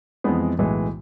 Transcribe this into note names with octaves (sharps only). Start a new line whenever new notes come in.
F2 E3 G#3 B3
B1 A2 E3 G#3